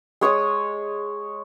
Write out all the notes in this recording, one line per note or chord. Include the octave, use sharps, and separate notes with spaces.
G#3 C#5 C#6 D#6